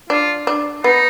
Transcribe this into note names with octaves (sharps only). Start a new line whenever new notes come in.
D4 F4
D4
B3 D#4